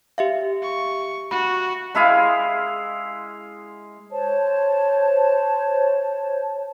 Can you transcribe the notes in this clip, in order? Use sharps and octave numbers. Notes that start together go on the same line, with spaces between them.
G4 E5 F5
C#6
F#4 B5
G#3 E4 G#4 F5
C5 C#5 A5